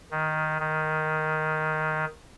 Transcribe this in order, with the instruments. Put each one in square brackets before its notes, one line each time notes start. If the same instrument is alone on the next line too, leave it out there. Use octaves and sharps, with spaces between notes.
[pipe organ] D#3
D#3